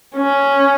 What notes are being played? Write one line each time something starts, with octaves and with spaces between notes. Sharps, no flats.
C#4